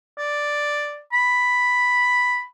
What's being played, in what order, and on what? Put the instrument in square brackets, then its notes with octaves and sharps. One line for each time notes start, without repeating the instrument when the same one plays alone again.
[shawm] D5
B5